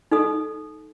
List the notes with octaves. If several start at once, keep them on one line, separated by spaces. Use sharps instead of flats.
D#4 A4 D#6